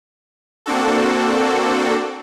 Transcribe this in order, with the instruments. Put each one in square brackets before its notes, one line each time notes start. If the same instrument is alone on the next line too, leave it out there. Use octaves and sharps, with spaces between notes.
[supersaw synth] A#3 C4 D4 F#4 A4